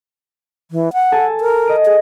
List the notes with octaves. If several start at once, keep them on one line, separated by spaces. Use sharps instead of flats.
E3
F#5
A4 G#5 E6
A#4
D#5 D7
G#4